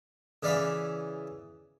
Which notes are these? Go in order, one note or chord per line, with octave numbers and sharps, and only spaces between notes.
C#3 E3 D5 F5 B5